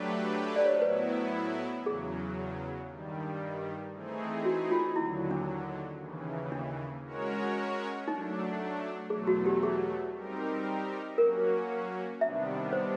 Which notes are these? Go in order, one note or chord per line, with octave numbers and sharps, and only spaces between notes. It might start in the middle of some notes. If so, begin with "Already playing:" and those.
Already playing: F#3 A3 D4 G4 B4
D5
C#5
C5
A2 F#3 B3 E4 B4
E2 C#3 F#3 G#4
G2 D#3 G3
E3 A3 C4 D#4 G#4
F#4
F4
D#2 D3 F#3 E4
D4
D#2 C#3 E3
D4
G#3 C#4 F#4 A#4 C#5
F#3 A3 D4 D#4
E2 B2 F#3 A3 G#4
F#4
G4
G#4
G3 C4 D#4 G4 A#4
F#3 A#3 C#4 F#4 A#4
C3 D#3 G3 B3 D4 E5
C5